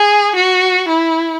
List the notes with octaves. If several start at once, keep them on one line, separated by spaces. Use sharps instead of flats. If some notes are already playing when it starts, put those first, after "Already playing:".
Already playing: G#4
F#4
E4